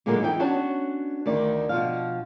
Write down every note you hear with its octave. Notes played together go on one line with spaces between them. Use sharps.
A#2 D3 F#3 G#3 A#3 B3
E2 E3 D#4 G5
B3 C#4 D4 F#4 C#5 A5
D2 D#3 D5
B2 F3 F5